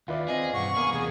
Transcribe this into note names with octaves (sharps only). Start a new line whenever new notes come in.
D#2 F4 B4 D5 E5
C4 G#4 D#5
B1 G2 F#5 C#6
A#3 B3 G#4
E2 C3 G#4